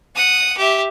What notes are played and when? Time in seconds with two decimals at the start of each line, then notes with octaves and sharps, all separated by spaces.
0.15 F#5 D#6
0.57 G4 E5